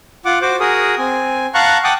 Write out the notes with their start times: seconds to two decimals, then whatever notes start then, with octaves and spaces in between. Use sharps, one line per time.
0.25 F4 F#5 D6
0.42 F#4 C5 D6
0.60 F#4 G#4 A#4 D#6
0.99 C4 G#5
1.54 F5 F#5 A5 A#5 C#6 F#6
1.84 F#5 G5 A5 D6 D#6 F#6